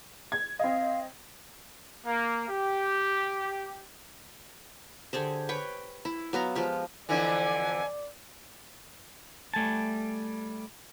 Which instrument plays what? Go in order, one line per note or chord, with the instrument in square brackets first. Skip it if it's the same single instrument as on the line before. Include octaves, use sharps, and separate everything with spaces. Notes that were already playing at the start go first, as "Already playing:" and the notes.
[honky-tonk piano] G#6
[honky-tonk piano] C4 D#5 [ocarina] F5
[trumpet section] A#3
G4
[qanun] D3 G4 G#4 C5
B4 C#5 G5
E4
F#3 B3 F5 A#5
F3 G#3 F4 G4
[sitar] F2 D3 E3 [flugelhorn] D5 [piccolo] G#5
[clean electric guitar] G3 A3 G#5 A5